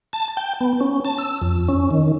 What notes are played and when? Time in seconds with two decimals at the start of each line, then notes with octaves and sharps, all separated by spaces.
0.13 A5
0.37 G5
0.61 B3
0.81 C#4
1.05 A5
1.18 E6
1.42 F2
1.68 C#4
1.91 D#3